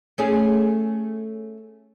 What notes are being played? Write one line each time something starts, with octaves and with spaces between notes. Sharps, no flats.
A3 C#4 G#4